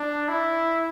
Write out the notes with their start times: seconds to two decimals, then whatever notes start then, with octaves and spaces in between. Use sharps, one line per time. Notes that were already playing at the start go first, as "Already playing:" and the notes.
Already playing: D4
0.28 E4